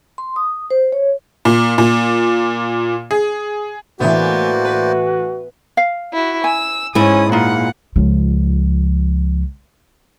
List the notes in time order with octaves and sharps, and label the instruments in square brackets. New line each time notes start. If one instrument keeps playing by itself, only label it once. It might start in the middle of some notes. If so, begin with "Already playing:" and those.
[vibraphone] C6
D#6
C5
C#5
[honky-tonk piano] A#2
A#2
G#4
[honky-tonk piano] A2 E3 [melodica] A#3 C5 D5 [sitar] B3 [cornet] F#4
[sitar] B4
[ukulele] F5
[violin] E4 F#4
[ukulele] G#5 [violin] E6
[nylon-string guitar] G#2 E4 [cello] C#4 [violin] D#6
[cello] A#2 [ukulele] D#4 F4 [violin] F#5
[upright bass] C#2 F3